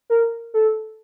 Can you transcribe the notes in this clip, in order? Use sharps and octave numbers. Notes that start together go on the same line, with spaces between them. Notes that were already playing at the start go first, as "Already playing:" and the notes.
A#4
A4